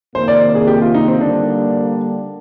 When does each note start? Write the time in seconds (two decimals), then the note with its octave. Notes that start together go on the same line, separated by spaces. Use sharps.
0.15 F2 C3 D#3 A#3 C5
0.28 D5
0.55 G#4
0.67 G4
0.81 F4
0.94 D#4
1.08 C4
1.21 D3 G3 A#3 D4